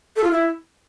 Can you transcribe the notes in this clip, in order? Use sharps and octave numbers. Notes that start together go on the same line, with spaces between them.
A4
F4
E4